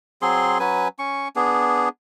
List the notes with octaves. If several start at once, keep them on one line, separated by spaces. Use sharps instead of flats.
F#3 C4 G#4 C6
F#3 C#4 B4 G#5
C#4 C#6
B3 D4 G#4